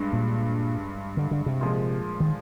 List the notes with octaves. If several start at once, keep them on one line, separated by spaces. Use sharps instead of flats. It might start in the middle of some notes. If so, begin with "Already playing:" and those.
Already playing: G2 G#3
A#2
D3
D3
C3
A#2 F3 G#3
D#3